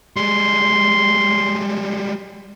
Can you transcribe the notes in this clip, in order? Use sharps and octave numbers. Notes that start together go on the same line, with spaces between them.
G3 G#3 C6